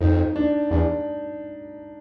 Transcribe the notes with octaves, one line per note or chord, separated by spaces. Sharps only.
F2 D#4
D4
E2 D4